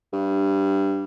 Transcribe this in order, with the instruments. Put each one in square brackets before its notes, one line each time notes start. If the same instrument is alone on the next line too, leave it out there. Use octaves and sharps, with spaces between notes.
[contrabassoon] G2